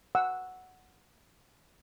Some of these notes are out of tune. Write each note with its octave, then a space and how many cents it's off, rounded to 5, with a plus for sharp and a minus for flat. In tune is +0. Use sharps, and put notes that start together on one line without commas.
F#5 +0 E6 -5